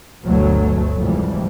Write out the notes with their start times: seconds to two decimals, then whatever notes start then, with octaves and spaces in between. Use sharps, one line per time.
0.24 G1 D2 B2 F#3 A3
0.97 F1 G#2 E3 G3